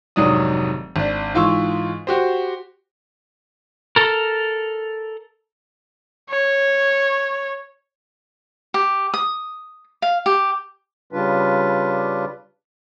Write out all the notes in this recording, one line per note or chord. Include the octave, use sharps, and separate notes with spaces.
F1 G#2 D#3 F#3 D4 D#6
G#1 D4
G#2 E3 F4 C6 C#6 E6
F#4 G4 C5
A4 A#4
C#5
G4
D#6
F5
G4
C#3 G3 D4 F4 B4